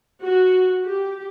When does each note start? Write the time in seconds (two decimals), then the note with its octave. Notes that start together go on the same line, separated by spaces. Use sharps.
0.22 F#4
0.85 G4